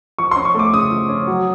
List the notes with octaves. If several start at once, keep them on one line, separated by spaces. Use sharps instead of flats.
F3 C#6
C#4 C6
C#6
A3 D6
C#3 D#6
F3
C#4
F#3